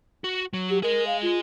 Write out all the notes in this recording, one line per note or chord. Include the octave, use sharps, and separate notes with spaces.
F#4
F#3
G4
G#4 A#4 D#5
F5
F4